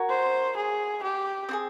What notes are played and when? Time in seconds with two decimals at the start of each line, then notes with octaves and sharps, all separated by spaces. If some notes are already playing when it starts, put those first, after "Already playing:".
Already playing: F#4 A#4 C#5
0.09 C5
0.56 G#4
1.03 G4
1.49 C4 F4 G#4